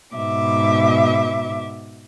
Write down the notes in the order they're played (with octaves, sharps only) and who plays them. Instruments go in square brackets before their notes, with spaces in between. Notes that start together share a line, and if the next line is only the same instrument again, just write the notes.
[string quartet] G#2 B2 E5 D6